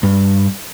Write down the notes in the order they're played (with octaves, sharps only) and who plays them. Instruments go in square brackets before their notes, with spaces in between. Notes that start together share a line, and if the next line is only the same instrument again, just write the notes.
[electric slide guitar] G2